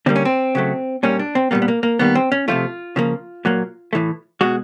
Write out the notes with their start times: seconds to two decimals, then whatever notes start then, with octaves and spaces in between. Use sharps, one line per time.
0.06 D3 G3 A#3 C4
0.16 C#4
0.25 C4
0.55 C#3 F#3 A3
1.03 A#2 G3 A#3 C#4
1.19 D4
1.35 C4
1.51 A#2 G3 A#3 B3
1.62 B3
1.68 A#3
1.83 A#3
1.99 D#3 G3 A#3 B3
2.15 C4
2.32 C#4
2.48 C3 F3 A3 F4
2.96 C#3 F3 A#3
3.45 A#2 F#3 A#3
3.93 A2 E3 A3
4.41 B2 G#3 F#4